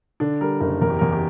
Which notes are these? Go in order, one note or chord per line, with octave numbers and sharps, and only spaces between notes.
D3 D4
G3 A#4
F#1 A#4
E2 A#4
G4
E2 A#4
G4